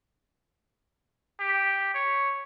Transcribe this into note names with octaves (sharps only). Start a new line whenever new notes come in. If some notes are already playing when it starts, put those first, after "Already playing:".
G4
C#5